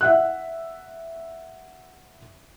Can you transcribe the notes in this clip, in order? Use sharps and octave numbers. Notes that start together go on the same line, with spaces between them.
E5 F#5 F#6